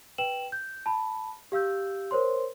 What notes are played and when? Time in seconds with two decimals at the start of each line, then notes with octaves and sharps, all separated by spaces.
0.18 B4 G5 E7 F#7
0.52 G6
0.86 A5 B5
1.52 G4 F5 E6 G6
2.11 A#4 C5 C#5 C6